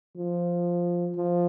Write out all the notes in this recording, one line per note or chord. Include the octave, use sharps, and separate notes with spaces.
F3
F3